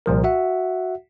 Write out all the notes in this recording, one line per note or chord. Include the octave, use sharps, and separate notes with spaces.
C2 A#2 F3 A#4
F#4 E5 F#5